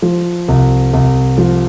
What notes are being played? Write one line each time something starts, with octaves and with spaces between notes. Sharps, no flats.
F3
C2
C2
F3